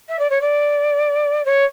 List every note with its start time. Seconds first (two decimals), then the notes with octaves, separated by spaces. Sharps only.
0.09 E5
0.19 D5
0.30 C#5
0.41 D5
1.45 C#5